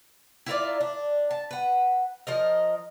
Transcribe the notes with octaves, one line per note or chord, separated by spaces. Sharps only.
E4 F4 A#4 D5
D4
A5
B4 F#5
F3 A#4 D#5